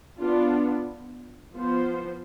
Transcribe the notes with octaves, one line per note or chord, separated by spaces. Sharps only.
B3 D4 F4
F3 B3 F4 C5